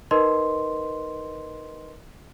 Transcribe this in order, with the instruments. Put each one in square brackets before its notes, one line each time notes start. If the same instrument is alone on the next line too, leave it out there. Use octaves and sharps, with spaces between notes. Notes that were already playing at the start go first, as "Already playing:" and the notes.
[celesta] D#4 A#4 B4 D#5 C6